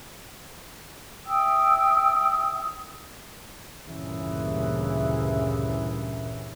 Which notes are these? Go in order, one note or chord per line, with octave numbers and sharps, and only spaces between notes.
E5 G5 D#6 E6
D2 G2 A#2 C#3 E3